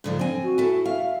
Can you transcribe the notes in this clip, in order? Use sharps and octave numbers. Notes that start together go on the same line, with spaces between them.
G#2 D3 F3
C4 G#5
F#4
E4 A4
E5 F5